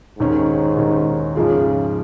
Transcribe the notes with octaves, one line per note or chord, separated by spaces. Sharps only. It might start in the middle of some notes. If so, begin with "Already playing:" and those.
D#2 G#2 D#3 C#4
D#2 D#3 C#4
G#2 C#3 F3 G#3 F4